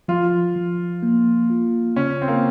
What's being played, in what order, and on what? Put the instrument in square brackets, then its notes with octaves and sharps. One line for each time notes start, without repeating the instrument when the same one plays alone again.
[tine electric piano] F3 [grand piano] F4
[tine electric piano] F3
A#3
F4
[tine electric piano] C#3 [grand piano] C#4
[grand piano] C4
A#3